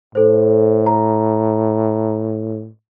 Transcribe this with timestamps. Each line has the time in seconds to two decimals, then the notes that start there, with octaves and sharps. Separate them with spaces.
0.15 A2 A4 C5
0.86 A#5